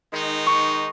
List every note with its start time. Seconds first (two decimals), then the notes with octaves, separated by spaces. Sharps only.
0.13 D#3 G#3 D#4
0.46 C#6